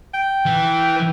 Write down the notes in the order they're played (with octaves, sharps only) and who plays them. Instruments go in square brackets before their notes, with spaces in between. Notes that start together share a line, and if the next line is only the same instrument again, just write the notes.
[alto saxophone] G5
[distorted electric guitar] E3
[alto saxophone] B4